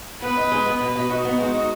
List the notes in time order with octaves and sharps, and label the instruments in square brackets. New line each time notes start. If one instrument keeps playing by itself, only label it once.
[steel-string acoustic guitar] B3 [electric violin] B4
[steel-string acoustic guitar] D#4
G#3
B3
[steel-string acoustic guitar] B2 [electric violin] B4
[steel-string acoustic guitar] B2
[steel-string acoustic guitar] D#4 [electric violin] F#4
[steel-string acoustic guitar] B3
G#3
D#4